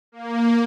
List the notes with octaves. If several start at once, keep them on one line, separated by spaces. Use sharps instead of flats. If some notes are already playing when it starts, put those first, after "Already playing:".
A#3